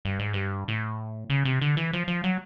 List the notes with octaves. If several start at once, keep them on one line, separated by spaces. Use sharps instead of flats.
G2
G#2
G2
A2
C#3
C3
D3
E3
F3
F3
F#3